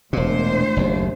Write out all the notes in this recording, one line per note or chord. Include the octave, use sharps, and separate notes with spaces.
E1 D2 A#2 C5
F#1 D#2